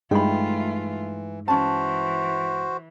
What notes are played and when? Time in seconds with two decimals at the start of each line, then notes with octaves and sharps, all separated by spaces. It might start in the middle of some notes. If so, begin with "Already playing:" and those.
0.11 G2 E3 G#3 A3 D#4 F4 G5 B5
1.48 E3 C#4 F#4 C5 A5